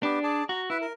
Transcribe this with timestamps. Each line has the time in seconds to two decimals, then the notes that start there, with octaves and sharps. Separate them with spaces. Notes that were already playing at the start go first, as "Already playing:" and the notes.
0.03 B3 D4 G4
0.23 G#4 D5 A5
0.49 F#4 A#5
0.70 E4 B4 E5
0.82 A#4